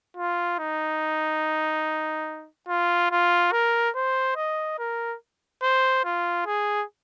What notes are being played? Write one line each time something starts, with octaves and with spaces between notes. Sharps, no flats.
F4
D#4
F4
F4
A#4
C5
D#5
A#4
C5
F4
G#4